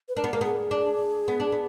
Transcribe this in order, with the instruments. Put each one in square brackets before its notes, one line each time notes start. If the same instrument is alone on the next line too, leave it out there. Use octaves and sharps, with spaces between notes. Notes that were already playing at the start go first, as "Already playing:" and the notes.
[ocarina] B4
[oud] D4 [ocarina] A#4
[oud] B3
A#3
[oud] B3 [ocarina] G#4
[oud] D4
B3
D4
B3